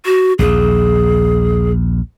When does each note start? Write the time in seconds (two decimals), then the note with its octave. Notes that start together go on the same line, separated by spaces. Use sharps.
0.05 F#4
0.39 A#1 D#2 G#4